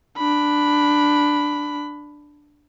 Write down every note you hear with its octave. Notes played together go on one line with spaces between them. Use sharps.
D4 B5